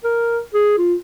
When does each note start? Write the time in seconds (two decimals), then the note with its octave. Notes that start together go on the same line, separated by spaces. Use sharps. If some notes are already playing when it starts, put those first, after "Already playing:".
0.04 A#4
0.54 G#4
0.78 F4